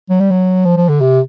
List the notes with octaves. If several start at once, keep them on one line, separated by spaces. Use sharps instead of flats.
F#3
G3
F#3
F3
F3
D3
C3